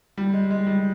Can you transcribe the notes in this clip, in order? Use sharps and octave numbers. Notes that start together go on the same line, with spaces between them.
G3
G#3
G#3
G3